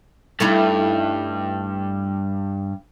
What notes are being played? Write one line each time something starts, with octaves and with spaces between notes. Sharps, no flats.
G2 A3 D#4 E4